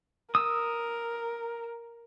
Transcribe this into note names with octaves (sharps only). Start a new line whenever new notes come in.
A#4 D#6 E6